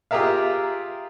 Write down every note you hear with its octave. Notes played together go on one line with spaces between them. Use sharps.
F4 G4 G#4 A#4 E5 F5